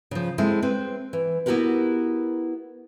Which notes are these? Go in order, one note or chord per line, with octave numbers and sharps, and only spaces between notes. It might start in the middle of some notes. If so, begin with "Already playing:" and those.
C#3 F3
G#3 C4 E4 G#4 A4
C4 B4
E3
B3 E4 F#4 G4 A#4 B4